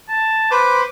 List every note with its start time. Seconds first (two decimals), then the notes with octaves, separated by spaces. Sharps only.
0.08 A5
0.51 B4 C5 C6 D6